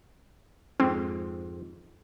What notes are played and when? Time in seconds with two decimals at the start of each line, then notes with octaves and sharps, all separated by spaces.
0.80 F2 G#2 C4